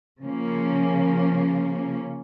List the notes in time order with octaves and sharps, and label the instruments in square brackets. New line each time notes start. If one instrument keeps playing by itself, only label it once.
[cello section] C#3 F3 A#3 C#4